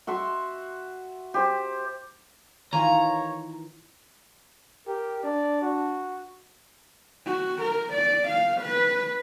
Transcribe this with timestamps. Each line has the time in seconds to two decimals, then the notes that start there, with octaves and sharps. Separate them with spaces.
0.07 F#4 E5 F#5 C6
1.34 G4 C5
2.73 D#3 E3 F4 C#5 G#5 A#5
4.87 G4 A#4
5.23 D4 D5
5.62 F#4
7.25 F#4
7.61 A#4
7.93 D5
8.28 F5
8.61 B4